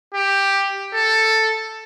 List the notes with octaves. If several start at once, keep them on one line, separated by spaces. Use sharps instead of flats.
G4
A4